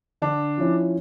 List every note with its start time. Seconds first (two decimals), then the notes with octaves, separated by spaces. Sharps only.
0.22 D3 D4
0.58 F3 C#4 E4